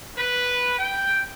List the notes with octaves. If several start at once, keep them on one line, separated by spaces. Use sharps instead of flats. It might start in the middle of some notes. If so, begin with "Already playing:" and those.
B4
G5